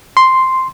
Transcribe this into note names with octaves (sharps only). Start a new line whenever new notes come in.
C6